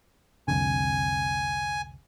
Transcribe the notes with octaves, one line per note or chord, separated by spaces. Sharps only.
C2 F2 D3 G#5